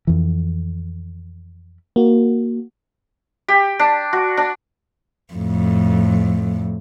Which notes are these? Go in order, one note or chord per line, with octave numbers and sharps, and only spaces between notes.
F2 E3
A#3 F#4
G4
D4
F#4
D4
F2 A2